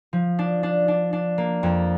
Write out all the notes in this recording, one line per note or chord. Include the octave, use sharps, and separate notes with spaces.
F3
D4
D4
D4
D4
A#3
F2